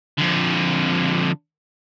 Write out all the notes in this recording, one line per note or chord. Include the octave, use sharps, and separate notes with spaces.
F2 D3